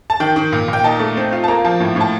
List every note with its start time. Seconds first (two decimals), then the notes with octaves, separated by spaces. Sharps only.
0.10 A5
0.20 D#3 G5
0.36 D#3
0.52 A#2
0.68 A#2
0.73 G5
0.84 D#4 A5
1.00 A3
1.17 C4
1.32 F4
1.44 A5
1.48 A#3 A#5
1.65 F3 A5
1.80 A2
1.96 A2 A5